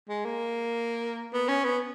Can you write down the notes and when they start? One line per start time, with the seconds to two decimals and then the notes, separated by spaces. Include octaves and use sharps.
0.09 G#3
0.25 A#3
1.33 B3
1.48 C#4
1.64 B3